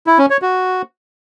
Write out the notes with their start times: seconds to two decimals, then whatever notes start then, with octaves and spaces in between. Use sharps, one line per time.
0.07 E4
0.18 C#4
0.30 C#5
0.42 F#4